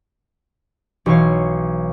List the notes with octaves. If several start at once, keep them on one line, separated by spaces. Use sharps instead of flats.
B1 E3 C#5 F5